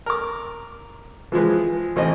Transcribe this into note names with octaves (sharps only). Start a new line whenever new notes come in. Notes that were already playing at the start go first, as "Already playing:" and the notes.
A#4 D6
E3 F3 G#3 B4
A1 E3 C4 D#5